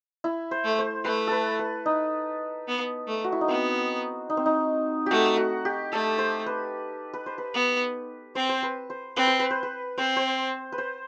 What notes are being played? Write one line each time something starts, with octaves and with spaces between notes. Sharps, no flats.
E4
C5
A3
C5
A3 B4
A4 B4
B4
D#4
B3
A3
F#4
E4
D#4
B3 C4
D#4
C4
D#4
A3 F#4 G4
F#4
G4
A3 A4
C5
B4
B4
C5
B4
B3
C4 C5
C5
B4
C5
C4 B4
C5
B4
C5
B4
C4 C5
C5
B4
C5